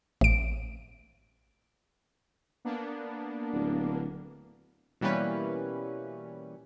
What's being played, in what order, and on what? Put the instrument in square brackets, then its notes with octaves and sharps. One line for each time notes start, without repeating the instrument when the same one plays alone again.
[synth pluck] A1 D7
[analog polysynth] A#3 B3 D4
[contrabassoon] D1
[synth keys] B2 E3 G3 A#3 C#4 B4